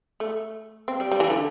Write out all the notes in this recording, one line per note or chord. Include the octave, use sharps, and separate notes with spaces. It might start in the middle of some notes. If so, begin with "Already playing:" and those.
A3
C4
G3
G3
E3
D3